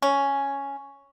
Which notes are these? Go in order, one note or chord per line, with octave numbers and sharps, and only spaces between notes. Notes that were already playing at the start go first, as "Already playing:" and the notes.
C#4